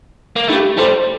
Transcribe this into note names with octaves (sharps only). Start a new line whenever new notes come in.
A#3
A3 E4 G4
G3 A4 C5